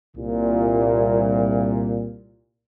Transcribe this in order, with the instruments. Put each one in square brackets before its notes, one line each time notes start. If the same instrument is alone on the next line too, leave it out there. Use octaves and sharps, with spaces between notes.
[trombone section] C2 A#2